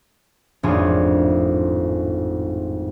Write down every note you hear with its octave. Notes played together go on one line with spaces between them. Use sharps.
G#1 F2 A2 F3 D4 G#4